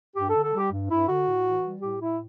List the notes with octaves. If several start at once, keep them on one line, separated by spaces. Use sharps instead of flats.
G2 G4
D3 A4
A4
G3 G4
G2
G2 E4
D3 F#4
A2
E3
G3
A2 G4
A2 E4